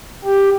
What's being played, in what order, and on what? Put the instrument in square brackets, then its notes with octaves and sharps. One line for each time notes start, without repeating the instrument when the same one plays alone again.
[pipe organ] G4